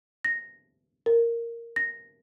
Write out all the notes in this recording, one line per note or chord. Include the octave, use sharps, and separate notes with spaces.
A#6
A#4
A#6